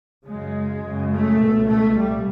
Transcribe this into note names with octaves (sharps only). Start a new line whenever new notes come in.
F#2 C#3 G#3
F#2 C#3
A3
C#2 B2
A3
C2 A#2 G3